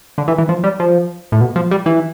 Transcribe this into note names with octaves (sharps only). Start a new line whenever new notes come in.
D3
E3
E3
F3
G3
F3
A2
B2
F3
G3
E3